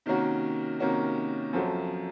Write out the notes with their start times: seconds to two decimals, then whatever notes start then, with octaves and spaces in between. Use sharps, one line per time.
0.06 C3 D#3 A#3 C#4 F#4
0.80 C3 D#3 A#3 C#4 F#4
1.53 F#2 F3 C4 F#4 A4